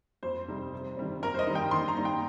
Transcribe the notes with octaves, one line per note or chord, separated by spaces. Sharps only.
F2 C5
C3 G3 D#4
C3
D#3 G3 C4
F2 A#4
C5
D#5
D#3 G3 D#4
G5
D#3 C6
A#5
G3 A#3 D#4
G5